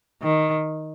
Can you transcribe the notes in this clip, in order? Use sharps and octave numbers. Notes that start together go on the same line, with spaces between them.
D#3